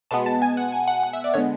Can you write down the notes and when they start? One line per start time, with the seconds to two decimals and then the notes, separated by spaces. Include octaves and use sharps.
0.11 B2 G#3 B3 A5
0.26 A5
0.42 G#5
0.57 F#5
0.72 G#5
0.88 F#5
1.03 F#5
1.13 E5
1.24 D5
1.34 D3 G#3 B3 C#5